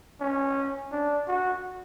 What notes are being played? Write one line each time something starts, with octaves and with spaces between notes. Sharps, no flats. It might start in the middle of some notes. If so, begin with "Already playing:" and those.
C#4
D4
F#4